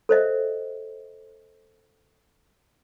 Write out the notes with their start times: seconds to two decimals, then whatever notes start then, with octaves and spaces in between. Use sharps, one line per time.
0.09 A4 C5 D#5 E5